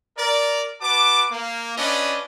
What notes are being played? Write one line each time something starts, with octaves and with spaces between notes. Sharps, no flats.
A#4 D5
F#4 B4 A5 D6
A#3
C#4 D4 F4 B4 D5 D#5